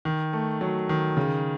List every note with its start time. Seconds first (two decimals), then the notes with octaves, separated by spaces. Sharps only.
0.05 D#3
0.33 A3
0.61 F#3
0.89 D#3
1.17 C#3